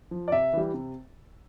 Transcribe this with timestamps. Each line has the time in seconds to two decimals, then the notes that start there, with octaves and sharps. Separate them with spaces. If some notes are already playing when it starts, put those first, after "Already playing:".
0.11 F3
0.28 D5
0.32 C3 E5
0.53 E3 G3
0.74 C3